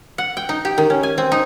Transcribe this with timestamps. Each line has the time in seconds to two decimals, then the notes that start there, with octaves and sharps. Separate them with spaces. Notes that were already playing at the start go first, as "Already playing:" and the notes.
0.18 F#5
0.37 G5
0.49 D#4
0.65 G4
0.78 D#3
0.90 C#4
1.03 G#5
1.18 C4
1.32 D#4